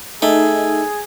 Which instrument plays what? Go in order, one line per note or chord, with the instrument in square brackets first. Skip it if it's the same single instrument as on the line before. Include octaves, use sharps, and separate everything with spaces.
[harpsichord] A3 [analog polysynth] D#4 [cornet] G#4